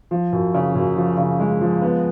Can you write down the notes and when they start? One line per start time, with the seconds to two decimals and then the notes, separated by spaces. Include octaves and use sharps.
0.11 F3
0.33 F#2
0.54 C#3
0.75 F#2
0.96 F3
1.17 C#3
1.40 G#3
1.61 F3
1.82 B3